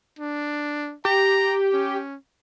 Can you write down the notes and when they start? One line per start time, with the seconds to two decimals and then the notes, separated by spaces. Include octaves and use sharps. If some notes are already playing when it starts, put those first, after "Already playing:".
0.19 D4
1.05 G4 A#5
1.73 C#4